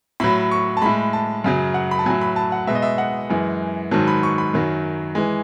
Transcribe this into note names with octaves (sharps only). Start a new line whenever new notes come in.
A2 F#3 B5
C#6
A5
A2 G#3 B5
A5
F#2 C#3 F#3
F#5
B5
A5
A2 F#3 G#5
B5
A5
F#5
B2 G#3 E5
D#5
E5
F#5
F#2 E3 G#3
G#2 D#3 F#3 A5
B5
C#6
B5
F#2 D#3 F#3
E3 G#3